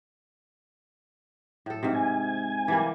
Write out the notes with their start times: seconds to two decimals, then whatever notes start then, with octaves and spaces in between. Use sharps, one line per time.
1.66 A2 A4
1.83 G#2 C3
1.94 G#5
2.68 E3 G3 A#3